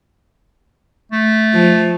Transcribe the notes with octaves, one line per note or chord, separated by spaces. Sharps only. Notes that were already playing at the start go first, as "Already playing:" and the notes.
A3
F3